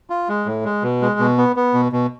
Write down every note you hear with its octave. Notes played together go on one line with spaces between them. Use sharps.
F4
G#3
A2
G#3
B2
G#3
B2
B3
B3
B2
B2